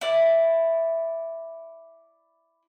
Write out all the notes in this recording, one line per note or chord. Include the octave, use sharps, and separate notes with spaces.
E4 D5